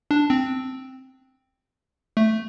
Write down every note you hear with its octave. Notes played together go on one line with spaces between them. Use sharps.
D4
C4
A3